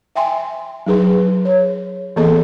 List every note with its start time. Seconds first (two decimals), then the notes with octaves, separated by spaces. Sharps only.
0.16 E5 G5 G#5 C6
0.87 F#3 D#4 G#4 B4 C6
1.45 C#5
2.16 E3 A#3 B3 G#4 A4 D#5